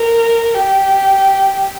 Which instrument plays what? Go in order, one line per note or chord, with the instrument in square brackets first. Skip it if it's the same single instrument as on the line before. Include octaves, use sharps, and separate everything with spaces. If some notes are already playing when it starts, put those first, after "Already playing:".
Already playing: [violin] A#4
G4